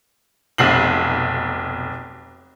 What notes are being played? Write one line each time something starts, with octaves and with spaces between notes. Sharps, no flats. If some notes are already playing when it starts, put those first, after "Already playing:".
F1 B1 C7 F#7